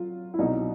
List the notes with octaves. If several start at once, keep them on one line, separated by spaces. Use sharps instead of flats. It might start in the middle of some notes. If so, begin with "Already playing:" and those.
Already playing: F#3 F4
E4
C2 B2 F#3 D#4